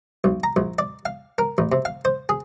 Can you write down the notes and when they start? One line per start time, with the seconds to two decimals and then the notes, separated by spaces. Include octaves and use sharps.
0.24 B1
0.44 A#5
0.56 A#1
0.79 D5
1.05 F5
1.38 A#4
1.58 A1
1.72 C3
1.85 F5
2.05 C5
2.29 G#4